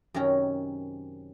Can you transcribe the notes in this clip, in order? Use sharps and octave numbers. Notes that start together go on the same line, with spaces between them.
F#2 C3 D#3 C#4 A#5